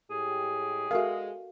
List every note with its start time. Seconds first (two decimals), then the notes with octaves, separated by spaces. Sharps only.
0.10 A2 G#3 G4 G#4
0.91 G#3 F#4 A4 A#4 E5 F5